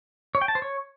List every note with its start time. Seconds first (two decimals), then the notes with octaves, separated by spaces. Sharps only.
0.35 C#5
0.42 G5
0.48 A5
0.55 C5
0.62 C#5